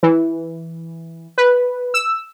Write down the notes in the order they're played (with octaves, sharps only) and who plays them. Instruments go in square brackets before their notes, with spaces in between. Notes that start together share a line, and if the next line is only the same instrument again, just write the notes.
[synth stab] E3
B4
E6